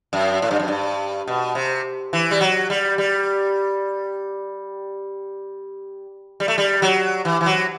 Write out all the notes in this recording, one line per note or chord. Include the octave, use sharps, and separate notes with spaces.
F#2
A2
G2
F#2
G2
B2
C3
E3
G3
F#3
G3
G3
G3
A3
G3
F#3
E3
E3
F#3